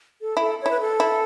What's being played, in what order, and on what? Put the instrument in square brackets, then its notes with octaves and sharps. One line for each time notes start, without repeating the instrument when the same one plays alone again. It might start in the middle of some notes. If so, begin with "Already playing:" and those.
[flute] A4
[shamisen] E4 [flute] A4
[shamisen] E4 [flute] C#5
[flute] B4
A4
[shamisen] E4